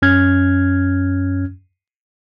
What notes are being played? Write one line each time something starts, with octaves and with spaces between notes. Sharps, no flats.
F#2 C#4 F6 G#6